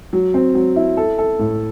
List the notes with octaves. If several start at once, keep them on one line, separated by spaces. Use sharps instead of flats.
F#3
C4
F#3
E4
A4
A4
A2